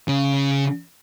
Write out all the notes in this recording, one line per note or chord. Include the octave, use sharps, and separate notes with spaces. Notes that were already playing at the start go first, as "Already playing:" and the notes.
C#3